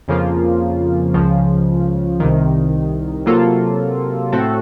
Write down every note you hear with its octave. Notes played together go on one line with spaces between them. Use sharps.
F2 C#3 F3 A#3 F4
C#2 C#3 F3
C2 C3 D#3
C3 F#3 A#3 F4 A4
A2 A3 C4 F#4 A4